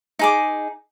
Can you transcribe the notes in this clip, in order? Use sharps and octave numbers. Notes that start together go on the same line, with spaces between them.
D#4 G#4 D6